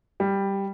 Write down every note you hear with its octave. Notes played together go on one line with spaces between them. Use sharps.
G3